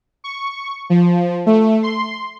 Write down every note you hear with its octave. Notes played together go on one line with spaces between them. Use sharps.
C#6
F3
A3
C6